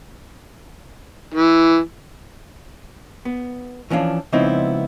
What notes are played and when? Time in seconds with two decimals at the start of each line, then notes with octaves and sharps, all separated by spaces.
1.34 E3
3.25 B3
3.90 E3 F3 C#4 D4 F5
4.33 C#2 F3 B3 C4 D#4 E4